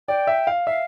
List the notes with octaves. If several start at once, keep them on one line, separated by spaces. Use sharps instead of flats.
D5 G5
E5
F5
E5 F5